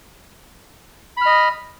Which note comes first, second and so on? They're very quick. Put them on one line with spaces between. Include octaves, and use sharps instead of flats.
B5 F6 D#5